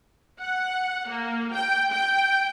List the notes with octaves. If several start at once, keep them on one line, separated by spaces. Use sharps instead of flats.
F#5
A#3
G5
G5